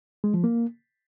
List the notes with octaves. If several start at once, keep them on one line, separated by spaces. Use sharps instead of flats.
G#3
F3
A#3